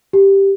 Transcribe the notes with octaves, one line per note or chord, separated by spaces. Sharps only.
G4